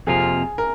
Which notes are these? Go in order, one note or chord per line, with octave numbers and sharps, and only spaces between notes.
F2 C3 F3 A#3 F4 G#4
A#4